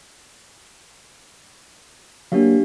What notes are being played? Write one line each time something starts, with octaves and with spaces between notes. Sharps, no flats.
F#3 A#3 D4 G4 F5